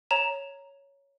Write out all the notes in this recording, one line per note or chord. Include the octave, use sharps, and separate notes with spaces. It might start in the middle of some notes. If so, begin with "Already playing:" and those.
C#5 A#5 E7